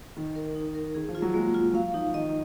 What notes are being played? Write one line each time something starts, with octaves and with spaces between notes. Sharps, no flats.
D#3 D#5
A#4
D#4
A#4
D#3 G#4
F3
F4
F#3
G#3 A#3
F4
F#3 F5
F3 D#4
D#3 D#5